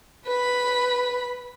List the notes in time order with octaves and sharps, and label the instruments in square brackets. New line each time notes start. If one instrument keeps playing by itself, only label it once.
[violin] B4 B5